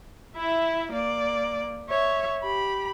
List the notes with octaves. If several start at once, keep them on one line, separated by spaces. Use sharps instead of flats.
E4 E5
A#3 D5
C#5 E5
G4 B5